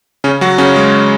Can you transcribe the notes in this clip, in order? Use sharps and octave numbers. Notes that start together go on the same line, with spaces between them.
C#3 C#4
F#3 F#4
C#3 C#4
G#3